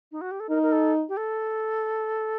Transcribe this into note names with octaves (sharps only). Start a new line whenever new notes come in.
D#4
F#4
G4
A4
D#4 A#4
A#4
A4
G4
A4